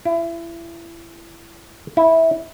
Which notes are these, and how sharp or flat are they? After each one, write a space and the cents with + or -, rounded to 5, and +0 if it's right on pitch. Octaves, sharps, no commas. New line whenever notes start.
E4 +30
E4 -15